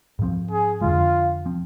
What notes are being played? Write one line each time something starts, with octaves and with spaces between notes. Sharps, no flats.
G#2 F3 C4
G#4
F2 D3 G#3 F4
F3 C4